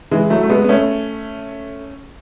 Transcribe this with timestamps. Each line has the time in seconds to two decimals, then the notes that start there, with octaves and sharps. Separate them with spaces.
0.11 E3 G#3
0.30 F#3 A3
0.43 A3
0.50 G#3 B3
0.64 B3
0.69 A3 C#4